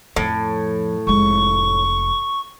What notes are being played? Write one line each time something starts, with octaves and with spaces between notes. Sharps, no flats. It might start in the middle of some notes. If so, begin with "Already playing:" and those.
F2 A2 F3
F1 G#3 C#6